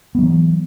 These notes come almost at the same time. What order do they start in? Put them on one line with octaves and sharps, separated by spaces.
B3 F#3 E3